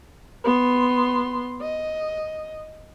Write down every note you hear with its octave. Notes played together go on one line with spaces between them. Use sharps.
B3 C6
D#5